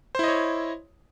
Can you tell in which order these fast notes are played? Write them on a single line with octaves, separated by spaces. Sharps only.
C5 E4 D#5 C#5